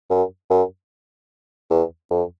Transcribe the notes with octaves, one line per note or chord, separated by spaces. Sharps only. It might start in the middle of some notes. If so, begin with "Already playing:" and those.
F#2
F#2
E2
F2